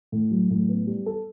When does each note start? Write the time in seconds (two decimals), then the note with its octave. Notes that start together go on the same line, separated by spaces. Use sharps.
0.12 A2
0.31 F#3
0.50 A2
0.69 B3
0.87 G3
1.06 A4